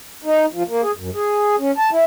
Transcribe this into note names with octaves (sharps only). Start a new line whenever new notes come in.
D#4
F3
A#3
G#4
F#2
G#4
C#4
A5
E4